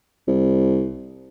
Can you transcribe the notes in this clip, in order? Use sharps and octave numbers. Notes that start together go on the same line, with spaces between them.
C2